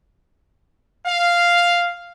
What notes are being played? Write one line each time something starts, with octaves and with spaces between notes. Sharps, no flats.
F5